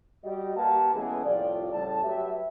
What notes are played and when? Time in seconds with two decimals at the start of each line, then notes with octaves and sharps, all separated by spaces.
0.24 G3 F#4 G4 D#5
0.57 A#3 G4 B4 F5 F#5 A5
0.94 E3 G#3 A3 B3 C#4 G#4
1.25 C2 A2 F3 F4 G4 D5
1.73 A2 C#3 G3 A3 A5
2.03 F#3 G4 B4 E5